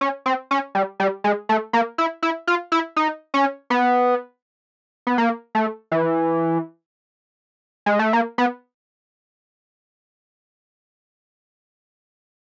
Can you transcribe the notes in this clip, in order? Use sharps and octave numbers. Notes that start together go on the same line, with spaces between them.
C#4
C4
C#4
G3
G3
G#3
A3
A#3
E4
E4
F4
E4
D#4
C#4
B3
B3
A#3
A3
E3
G#3
A3
A#3
B3